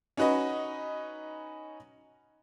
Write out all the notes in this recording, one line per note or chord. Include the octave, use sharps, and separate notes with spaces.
C#4 D#4 F#4 B4 D#5